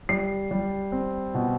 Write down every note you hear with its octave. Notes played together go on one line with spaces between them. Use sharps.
G3 C7
G3
C4
B2